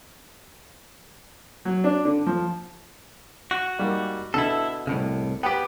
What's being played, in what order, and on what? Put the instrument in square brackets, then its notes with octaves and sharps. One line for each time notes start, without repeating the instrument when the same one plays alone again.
[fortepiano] F#3
D4
D3
F3
[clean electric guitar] F#4
[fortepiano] G#2 G3 A#3
[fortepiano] B2 D3 [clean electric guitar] E4 A4
[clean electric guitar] C2 A2 C#3
[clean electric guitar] B3 G4 [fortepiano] B4 G5